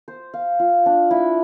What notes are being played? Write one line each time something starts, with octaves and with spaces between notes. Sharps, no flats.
C5
F5
F4
D4
E4